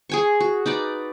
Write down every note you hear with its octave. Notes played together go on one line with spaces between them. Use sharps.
G#4 G#5 C#6
F#4
D#4 B4 D5